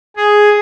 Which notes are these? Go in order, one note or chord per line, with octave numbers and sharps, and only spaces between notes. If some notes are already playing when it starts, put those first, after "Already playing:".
G#4